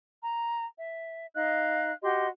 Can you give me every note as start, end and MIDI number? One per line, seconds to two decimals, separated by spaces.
0.23 0.65 82
0.79 1.26 76
1.34 1.92 63
1.34 1.92 75
1.34 1.92 77
1.34 1.92 90
2.02 2.26 66
2.02 2.26 67
2.02 2.26 75
2.02 2.26 84